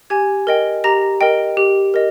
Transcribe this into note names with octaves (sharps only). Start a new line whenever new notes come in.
G4 G#5 G#6
A#4 D#5 G5
G4 A#5 A#6
A#4 D#5 G5
G4
A#4 D#5